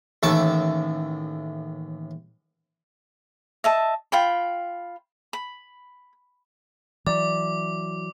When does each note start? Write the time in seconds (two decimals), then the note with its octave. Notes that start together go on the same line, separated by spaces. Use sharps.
0.23 A1 D#2 E5 A5 C#6 D6
3.64 D#5 E5 A5
4.12 F4 G5 B5
5.33 B5
7.07 E3 F#3 D5 D6